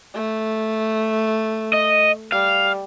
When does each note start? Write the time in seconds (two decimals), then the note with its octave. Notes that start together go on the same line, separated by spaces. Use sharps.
0.14 A3
1.73 D#5
2.32 G3 F5